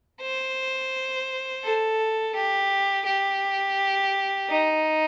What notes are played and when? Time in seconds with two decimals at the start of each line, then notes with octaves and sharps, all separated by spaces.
0.21 C5
1.64 A4
2.35 G4
3.05 G4
4.49 D#4